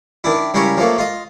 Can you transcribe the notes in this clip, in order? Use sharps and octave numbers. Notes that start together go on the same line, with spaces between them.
D#3 D4 E4
C#3 G3 E4 A#4 C#5
F3 F#3 A3 A#3
F4 D#5